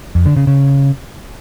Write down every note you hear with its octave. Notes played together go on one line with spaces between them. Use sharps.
F2
D3
C#3
C#3